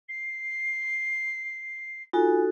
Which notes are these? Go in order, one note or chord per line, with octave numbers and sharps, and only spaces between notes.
C7
D#4 F4 F#4 A4 G#5